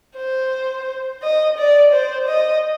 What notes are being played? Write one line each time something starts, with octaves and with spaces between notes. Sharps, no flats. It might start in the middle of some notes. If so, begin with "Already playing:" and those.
C5
D#5
D5
C5
D#5